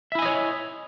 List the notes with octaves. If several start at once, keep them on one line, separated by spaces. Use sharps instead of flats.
E4 C#5 D#5 E5 G#5